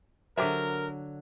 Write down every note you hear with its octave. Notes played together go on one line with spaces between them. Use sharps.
D3 F#3 G4 A#4 C5 E5